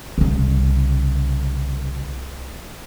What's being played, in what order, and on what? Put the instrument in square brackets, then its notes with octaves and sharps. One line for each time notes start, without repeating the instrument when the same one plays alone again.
[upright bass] C2 C#3